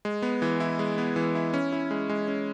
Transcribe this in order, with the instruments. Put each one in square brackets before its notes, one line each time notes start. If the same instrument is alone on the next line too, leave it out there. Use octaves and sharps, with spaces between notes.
[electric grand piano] G#3
B3
E3
E4
G#3
B3
E3
E4
C#4
E4
G#3
G#3
C#4